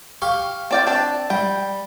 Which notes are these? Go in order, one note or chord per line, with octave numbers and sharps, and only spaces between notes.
G4 F5 C#6
C4 D5 G5
C4 D4
G3 G5